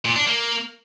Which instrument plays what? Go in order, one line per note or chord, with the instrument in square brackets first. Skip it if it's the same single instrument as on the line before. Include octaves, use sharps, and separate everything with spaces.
[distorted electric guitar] A#2
D4
A#3